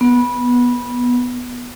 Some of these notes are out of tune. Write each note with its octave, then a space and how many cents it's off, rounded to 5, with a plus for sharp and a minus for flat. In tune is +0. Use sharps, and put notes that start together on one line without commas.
B3 -20